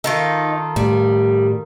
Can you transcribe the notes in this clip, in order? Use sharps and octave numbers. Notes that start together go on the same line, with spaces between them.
D#3 D#4 F4 A4
A2 G3